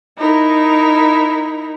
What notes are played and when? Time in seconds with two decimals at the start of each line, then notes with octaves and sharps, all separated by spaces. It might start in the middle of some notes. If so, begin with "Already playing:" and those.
0.17 D#4 E4 A#4